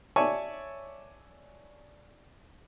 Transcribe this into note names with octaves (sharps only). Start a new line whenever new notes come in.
C#5 D5 E5 G#5 A5 C#6